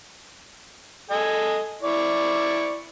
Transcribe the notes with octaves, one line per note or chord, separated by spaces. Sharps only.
A4 D#5 G#5
E4 D5 C#6